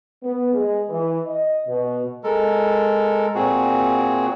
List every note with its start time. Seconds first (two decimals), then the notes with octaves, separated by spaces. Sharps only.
0.23 B3
0.53 G#3
0.89 E3
1.25 D#5
1.67 B2
2.24 G#3 A4 A#4
3.35 A#2 C4 F#4 G#4